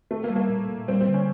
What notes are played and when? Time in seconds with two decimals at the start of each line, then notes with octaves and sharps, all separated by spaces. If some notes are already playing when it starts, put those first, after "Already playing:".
0.11 A3 C4
0.24 A#3
0.29 G3
0.36 A#3
0.49 A#2
0.69 A#2
0.88 G3 C4
1.01 C4
1.08 D3
1.14 C#4